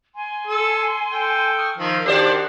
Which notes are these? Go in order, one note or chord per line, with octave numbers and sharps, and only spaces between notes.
G#5 C6
A4
A4 G5
C#6 D#6 F6
D#3 F3 A#4 E6 F6
D#3 D4 F#4 G4 A#4 C5 D5